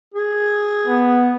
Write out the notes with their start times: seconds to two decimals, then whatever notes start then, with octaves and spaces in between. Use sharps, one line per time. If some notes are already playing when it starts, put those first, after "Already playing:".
0.14 G#4
0.87 B3